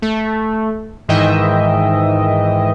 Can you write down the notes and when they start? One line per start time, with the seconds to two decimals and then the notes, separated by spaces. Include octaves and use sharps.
0.02 A3
1.08 G#2 D#3 E3 D#5 E5 G5